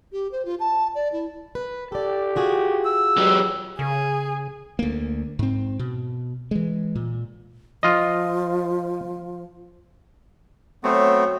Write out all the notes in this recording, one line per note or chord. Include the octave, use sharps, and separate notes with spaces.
G4
C5
F4
A5
D5
E4
B4
G4 A4 D5
F4 F#4 G#4
E6
B2 F#3 G4
C#3 G#4
D2 A#3
G#2 C4
B2
E3 G#3
A#2
F3 F4 D#5
F#3 A3 B3 C4 C#6